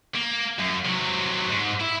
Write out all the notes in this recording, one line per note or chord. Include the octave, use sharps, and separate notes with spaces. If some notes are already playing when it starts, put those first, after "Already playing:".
A#3
F#2
C3 F#3
G#2
E4